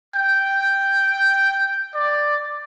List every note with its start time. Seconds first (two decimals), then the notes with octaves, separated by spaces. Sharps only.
0.15 G5
1.94 D5